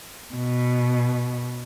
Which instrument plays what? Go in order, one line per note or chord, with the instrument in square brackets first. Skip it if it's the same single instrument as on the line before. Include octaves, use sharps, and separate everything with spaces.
[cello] B2